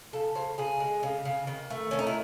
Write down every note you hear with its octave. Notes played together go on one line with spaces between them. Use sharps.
C#3 A4
C#3 C5
C#3 G#4
G#3
C#3
C#3
D#3
A3
D#3 C#4
D#4
E4